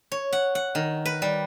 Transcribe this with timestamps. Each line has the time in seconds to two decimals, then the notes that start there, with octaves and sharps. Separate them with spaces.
0.12 C#5
0.33 F#5
0.55 F#5
0.75 D#3
1.05 B4
1.22 G3